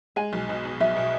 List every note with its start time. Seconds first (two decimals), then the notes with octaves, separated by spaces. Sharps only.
0.16 G#3 G#5
0.33 B1
0.49 B2
0.65 B2
0.81 B1 E5
0.96 B2